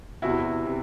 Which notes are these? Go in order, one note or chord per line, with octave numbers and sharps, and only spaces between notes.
E2 C3 E3 E4 F#4
C3